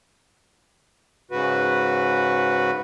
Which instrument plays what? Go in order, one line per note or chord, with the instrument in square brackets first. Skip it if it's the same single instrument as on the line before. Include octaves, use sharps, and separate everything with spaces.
[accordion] G#2 C#3 F#4 B4